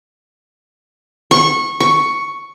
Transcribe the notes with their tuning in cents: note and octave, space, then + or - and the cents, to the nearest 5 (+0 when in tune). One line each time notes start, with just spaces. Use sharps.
C#6 -20
C#6 +5